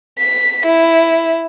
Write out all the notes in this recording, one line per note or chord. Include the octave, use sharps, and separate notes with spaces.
B6
E4